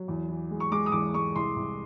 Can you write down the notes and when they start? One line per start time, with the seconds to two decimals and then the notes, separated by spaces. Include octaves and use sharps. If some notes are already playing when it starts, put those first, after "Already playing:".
Already playing: F#3
0.08 E2
0.28 E3
0.51 G#3
0.60 C#6
0.71 G#3 D6
0.86 D#6
0.92 E2 D6
1.14 G#3 C#6
1.35 C2 C6
1.56 C2